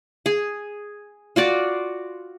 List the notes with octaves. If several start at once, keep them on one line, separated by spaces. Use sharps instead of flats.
G#4
F4 F#4 D5